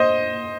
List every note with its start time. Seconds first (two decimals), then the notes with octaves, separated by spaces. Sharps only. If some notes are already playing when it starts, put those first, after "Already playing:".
Already playing: C5 D#5